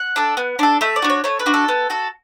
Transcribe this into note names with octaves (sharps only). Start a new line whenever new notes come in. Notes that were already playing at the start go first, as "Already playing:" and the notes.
Already playing: F#5
D4 A4
B3
D4 A4
A3 E5
D5
D4 F#4
C#5
A3 C#5
B4
D4 F#4
A4
B3
F#4 A4